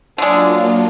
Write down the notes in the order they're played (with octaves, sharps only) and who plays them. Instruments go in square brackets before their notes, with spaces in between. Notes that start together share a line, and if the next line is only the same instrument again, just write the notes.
[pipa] D3 G#3 [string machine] F#3 A#3 F4 [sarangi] D4